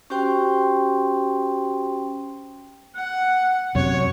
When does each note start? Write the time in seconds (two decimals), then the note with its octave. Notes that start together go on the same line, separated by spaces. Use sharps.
0.10 C#4 F#4 G4 C5 G5 C6
2.96 F#5
3.75 F#2 C3 C#5